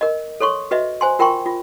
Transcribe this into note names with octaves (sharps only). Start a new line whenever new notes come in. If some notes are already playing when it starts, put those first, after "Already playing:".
A#4 D#5
A4 C#5 C6 C#6
F#4 B4 D#5 E5
C5 G#5 C6
F4 A#4 G5 A#5 C6 C#6
F4